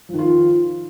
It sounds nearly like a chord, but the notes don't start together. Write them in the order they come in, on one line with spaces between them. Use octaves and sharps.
F3 D#3 F4